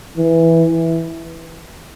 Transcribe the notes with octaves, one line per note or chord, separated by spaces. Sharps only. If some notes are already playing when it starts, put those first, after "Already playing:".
E3